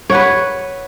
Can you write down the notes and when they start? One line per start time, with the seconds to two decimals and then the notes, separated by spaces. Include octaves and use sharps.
0.10 C#5
0.12 F#5
0.15 B4